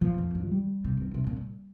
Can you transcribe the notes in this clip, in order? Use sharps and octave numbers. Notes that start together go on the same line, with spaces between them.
A#2 F3
F2
G2
F3
G3
C3
D#3
C3
A#2